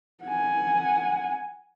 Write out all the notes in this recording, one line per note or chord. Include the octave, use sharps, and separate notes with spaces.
F#5 G#5